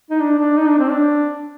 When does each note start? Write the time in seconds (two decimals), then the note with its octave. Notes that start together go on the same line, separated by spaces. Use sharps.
0.11 D#4
0.20 D4
0.39 D4
0.57 D#4
0.68 D4
0.79 C4
0.90 D4